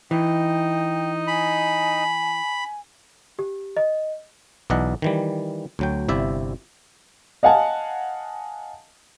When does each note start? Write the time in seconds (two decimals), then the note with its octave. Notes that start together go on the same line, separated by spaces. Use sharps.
0.11 E3 D#4 D#5 G5
1.28 G#5 B5
3.39 G4
3.77 D#5
4.70 B1 E3 D5 D#5 F#5
5.02 D#3 E3 G3
5.79 D2 F#3 G5
6.08 G1 C3 E4 D5 E5
7.43 D#5 F5 F#5 G#5 A5